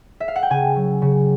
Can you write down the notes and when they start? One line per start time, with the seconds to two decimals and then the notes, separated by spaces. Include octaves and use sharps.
0.20 E5
0.28 F5
0.36 F#5
0.43 G5
0.50 C#3 G#5
0.76 F#3
1.02 C#3